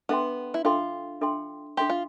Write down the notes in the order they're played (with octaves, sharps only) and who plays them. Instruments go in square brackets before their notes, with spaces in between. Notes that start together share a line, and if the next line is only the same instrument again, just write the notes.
[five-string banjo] B3 [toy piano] D4 A4 E5 G5 C6
[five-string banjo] E4
[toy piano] D4 A4 E5 G5 C6 [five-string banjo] F4
[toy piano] D4 A4 E5 G5 C6
[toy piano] D4 A4 E5 G5 C6 [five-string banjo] G4
[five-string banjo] F4